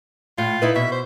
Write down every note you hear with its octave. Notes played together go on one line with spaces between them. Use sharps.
A2 F4
D#4 E4 B4
B2 E5
C5